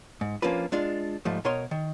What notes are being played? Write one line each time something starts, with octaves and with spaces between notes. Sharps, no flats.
G#2
F3 A#3 C#4 D4 F4 B4
G#3 D4 F4
G#2 F3 G3 A3
B2 A#4 C#5 D#5 F5 C6
D#3